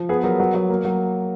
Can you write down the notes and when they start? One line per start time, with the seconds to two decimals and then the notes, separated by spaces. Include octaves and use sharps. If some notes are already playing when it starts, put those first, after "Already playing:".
Already playing: F3
0.09 B3 G#4
0.24 F#3 A#4
0.40 F#3
0.54 F#3
0.70 A#3
0.85 F#3